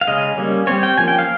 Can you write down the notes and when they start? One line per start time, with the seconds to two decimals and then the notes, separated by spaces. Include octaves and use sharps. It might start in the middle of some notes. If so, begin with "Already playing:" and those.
0.01 F5
0.07 C#3 G#3 C#4 D#5
0.38 G3 A#3 C#4
0.67 G3 C4 C#5
0.83 G5
0.98 F3 A#3 C#4 G#5
1.08 G5
1.19 F5